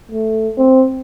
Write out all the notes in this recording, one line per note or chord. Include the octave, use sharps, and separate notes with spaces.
A3
C4